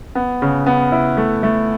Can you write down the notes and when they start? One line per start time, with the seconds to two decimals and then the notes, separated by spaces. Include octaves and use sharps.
0.15 B3
0.42 C#3
0.66 B3
0.92 E4
1.17 A3
1.43 A3